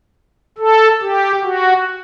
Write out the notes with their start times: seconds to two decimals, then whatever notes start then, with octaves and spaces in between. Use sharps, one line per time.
0.58 A4
1.02 G4
1.44 F#4